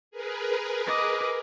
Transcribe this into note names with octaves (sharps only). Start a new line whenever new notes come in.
G#4 A#4 B4
D#5 D6